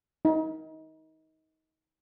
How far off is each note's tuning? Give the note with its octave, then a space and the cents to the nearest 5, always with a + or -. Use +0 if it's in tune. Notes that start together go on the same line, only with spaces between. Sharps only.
D#4 +25